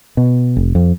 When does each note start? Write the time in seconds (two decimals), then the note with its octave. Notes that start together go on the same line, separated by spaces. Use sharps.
0.17 B2
0.57 F1
0.75 F2